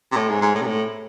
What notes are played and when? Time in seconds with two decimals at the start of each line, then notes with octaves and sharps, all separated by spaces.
0.12 C3
0.17 A2
0.30 G#2
0.42 G#2
0.55 A2
0.62 C3
0.67 A2